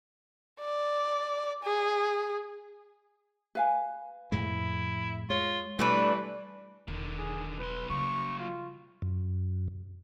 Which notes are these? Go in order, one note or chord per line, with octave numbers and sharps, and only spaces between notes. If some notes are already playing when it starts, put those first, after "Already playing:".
D5
G#4
B4 F5 G#5
F2 A2 G#3 E4
G#3 F4 C#5
E3 G3 A3 D4 B4
E1 D3 D#3
G#4
B1 B4 C6
C#3 F#3 G3 A#3 C#6
F4
F#2